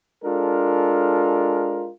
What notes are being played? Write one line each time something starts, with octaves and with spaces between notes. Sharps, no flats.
G#3 D4 F4 A4 A#4